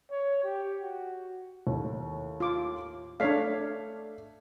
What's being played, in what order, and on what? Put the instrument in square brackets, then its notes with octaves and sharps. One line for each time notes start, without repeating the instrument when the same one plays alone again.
[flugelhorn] C#5
G4
F#4
[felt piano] D#2 A2
[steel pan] F4 D6
[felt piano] A3 D5 B6 [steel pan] D4 C#5 F5